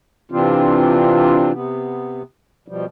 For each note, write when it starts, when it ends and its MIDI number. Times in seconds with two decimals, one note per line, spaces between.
0.31 1.52 48
0.31 1.52 52
0.31 1.52 60
0.31 1.52 62
0.31 1.52 65
1.52 2.22 48
1.52 2.22 59
2.68 2.85 47
2.68 2.85 53
2.68 2.85 55